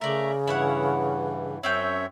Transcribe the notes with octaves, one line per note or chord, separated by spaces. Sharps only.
C#3 A3 A#4 D5 E5 A#5
G2 E3 E4 C#5 F#5
F#2 C4 C#4 C#5 E5 G5